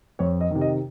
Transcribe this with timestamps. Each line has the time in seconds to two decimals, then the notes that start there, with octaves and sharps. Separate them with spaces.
0.19 F2 C#5
0.41 D#5
0.51 C3 D#3
0.61 D#5